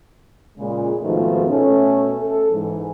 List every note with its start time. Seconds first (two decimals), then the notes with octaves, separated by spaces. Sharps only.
0.58 A#2 C#3 G#3
1.02 F2 G#2 B2 D#3 F3 A3
1.48 B2 A3 C#4
2.21 A4
2.51 G#2 E3